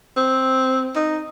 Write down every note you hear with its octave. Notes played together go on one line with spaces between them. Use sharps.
C4
D#4